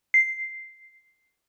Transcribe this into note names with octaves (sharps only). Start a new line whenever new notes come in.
C7